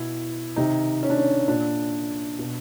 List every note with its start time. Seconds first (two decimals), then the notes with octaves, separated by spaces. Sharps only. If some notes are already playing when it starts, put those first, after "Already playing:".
Already playing: B2 E4
0.56 C3 D#3 D#4
1.03 C#4
1.10 D4
1.18 C#4
1.48 A#2 D4
2.39 B2